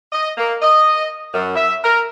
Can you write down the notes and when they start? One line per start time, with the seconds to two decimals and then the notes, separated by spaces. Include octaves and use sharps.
0.12 D#5
0.38 A#3
0.62 D#5
1.34 F#2
1.56 E5
1.83 A#4